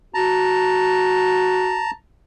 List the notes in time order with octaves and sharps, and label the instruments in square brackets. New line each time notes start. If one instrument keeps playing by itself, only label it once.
[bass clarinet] F#4 [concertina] A5 A#5